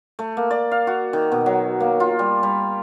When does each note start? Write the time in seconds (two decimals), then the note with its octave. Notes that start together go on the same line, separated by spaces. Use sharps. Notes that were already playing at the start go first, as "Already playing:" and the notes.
0.19 A3
0.37 A#3
0.51 D5
0.71 F5
0.87 F#4
1.13 D#3
1.32 B2
1.46 F#3
1.80 A#3
2.00 F4
2.19 G3
2.43 G3